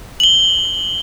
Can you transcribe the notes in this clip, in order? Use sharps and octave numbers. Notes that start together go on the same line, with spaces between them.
F#7 G7